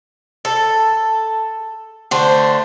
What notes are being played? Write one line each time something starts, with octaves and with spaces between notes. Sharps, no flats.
A4
D3 A3 C5